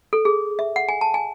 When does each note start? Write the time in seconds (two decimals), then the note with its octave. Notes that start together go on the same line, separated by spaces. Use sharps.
0.13 A4
0.25 G#4
0.59 E5
0.76 F#5
0.89 G#5
1.01 A5
1.14 G#5